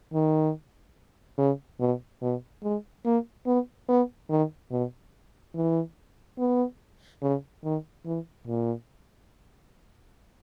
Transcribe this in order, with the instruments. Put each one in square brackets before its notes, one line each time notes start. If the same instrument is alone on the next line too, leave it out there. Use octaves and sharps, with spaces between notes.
[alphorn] D#3
C#3
B2
B2
G#3
A#3
B3
B3
D#3
B2
E3
B3
C#3
D#3
E3
A#2